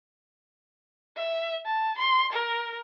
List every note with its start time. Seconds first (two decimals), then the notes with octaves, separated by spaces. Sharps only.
1.17 E5
1.66 A5
1.98 C6
2.33 A#4